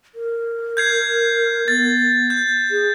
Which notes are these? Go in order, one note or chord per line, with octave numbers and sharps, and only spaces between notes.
A#4
G6 G#6 C7
B3 A6
G6
G#4